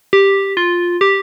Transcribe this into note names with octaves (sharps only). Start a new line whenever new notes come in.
G4
F4
G4